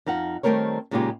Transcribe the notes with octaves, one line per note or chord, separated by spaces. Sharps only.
F2 D#4 F5 F#5
D#3 G3 A3 C4 A#4 C#5
A#2 C#3 G#3 D#4 F4 G4